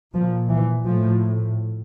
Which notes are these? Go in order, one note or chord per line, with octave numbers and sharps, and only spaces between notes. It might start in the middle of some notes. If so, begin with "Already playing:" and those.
A#2 F3
E3
A2 F3